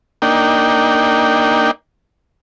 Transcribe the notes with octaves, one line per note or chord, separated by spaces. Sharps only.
A#3 D4 D#4 G5